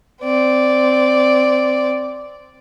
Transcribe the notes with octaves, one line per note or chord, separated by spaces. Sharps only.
C4 D5